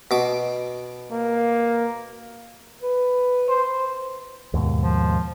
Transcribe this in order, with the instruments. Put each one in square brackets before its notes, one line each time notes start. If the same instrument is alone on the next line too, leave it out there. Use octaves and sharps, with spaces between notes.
[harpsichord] B2 D6
[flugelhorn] A#3
[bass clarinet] B4
[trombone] C5
[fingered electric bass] D#2 G#2 B2
[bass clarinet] F3